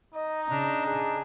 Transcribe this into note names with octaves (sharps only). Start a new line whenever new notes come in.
D#4 D#5
C#3 D4 A#5
D4 G#4